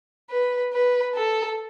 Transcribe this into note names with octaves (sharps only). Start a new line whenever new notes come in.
B4
B4
A4